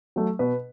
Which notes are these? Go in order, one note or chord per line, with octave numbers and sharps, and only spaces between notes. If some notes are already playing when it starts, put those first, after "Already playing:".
F#3 A3
B2 B4